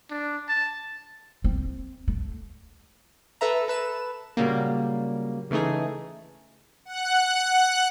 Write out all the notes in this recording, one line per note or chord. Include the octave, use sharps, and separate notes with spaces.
D4
A5
C4
A3
A4 B4 E5 A#5
A4 B4 E7
A#2 C#3 F#3 G3 A#3
C#3 E3 A3 D#4 G#4
F#5 F#6